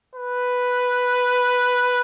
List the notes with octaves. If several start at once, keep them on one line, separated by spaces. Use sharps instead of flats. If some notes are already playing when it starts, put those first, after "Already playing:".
B4